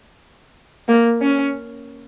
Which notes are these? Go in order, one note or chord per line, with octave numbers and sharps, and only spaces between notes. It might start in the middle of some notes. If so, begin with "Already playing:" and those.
A#3
C#4